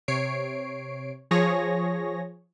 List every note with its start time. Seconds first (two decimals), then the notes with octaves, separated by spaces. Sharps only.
0.08 C3 C#5 C7 D7
1.31 F3 G#4 C#5 A#6